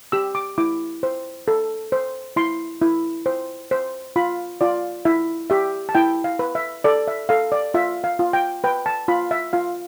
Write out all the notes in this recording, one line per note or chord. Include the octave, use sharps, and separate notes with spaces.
G4 E6
D6
E4 D6
C5
A4
C5
E4 C6
E4
C5
C5
F4 B5
F4 D5
E4 E5
G4 E5
A5
E4 G5
F5
B4
E5
A4 D5
E5
A4 F5
D5
F4 E5
F5
F4
G5
B4 G5
A5
F4 B5
E5
F4 F5